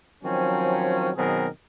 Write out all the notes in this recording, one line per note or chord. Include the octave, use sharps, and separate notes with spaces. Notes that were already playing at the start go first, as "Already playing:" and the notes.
D#3 F3 F#3 C4 C#4
B2 D#3 F#3 C4 G#4 A#4